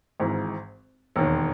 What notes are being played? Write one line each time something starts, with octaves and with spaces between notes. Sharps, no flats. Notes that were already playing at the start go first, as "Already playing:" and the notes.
G#1 G#2 E3
E1 D#2 D#3